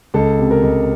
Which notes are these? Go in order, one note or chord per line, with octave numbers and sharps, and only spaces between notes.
C#2 A4
C3
A#4
C#2